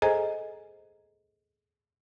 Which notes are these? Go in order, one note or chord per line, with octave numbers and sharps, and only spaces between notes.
G#4 A4 C5 D#5 G#5 A#5